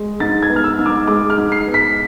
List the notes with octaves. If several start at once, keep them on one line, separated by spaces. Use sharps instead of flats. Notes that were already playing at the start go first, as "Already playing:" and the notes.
Already playing: G#3
G#2 A6
G#6
B3
F6
E6
G#2
D6
G#3 D6
F6
G#2
C7
B3
B6